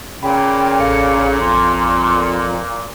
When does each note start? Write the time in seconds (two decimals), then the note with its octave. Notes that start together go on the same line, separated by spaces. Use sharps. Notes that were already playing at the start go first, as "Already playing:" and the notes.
0.23 A#2 C#3 G5 B5
0.79 A1 A4 F5 C#7
1.40 F2 C6